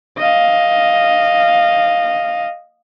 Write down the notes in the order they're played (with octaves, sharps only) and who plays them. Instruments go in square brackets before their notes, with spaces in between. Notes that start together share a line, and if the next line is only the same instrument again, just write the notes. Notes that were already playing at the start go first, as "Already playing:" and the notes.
[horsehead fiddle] D#5 F5